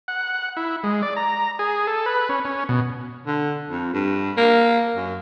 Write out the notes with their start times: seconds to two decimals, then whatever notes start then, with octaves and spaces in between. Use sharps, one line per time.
0.08 F#5
0.57 E4
0.84 G#3
1.02 D5
1.16 A#5
1.59 G#4
1.87 A4
2.06 B4
2.29 C#4
2.45 C#4
2.69 B2
3.27 D3
3.70 F2
3.94 G2
4.37 A#3
4.96 F#2